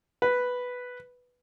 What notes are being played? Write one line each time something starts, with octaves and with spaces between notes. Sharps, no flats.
B4